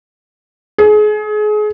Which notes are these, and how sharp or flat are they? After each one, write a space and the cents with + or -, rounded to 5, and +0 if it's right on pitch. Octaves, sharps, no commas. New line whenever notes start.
G#4 +30